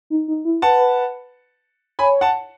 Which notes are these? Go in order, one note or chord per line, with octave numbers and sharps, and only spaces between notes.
D#4
D#4
E4
B4 F#5 A5
C#5 G#5 B5
F#5 A5